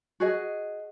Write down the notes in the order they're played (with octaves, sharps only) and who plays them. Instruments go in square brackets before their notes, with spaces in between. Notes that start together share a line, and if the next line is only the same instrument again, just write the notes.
[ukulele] F#4 G#4 D#5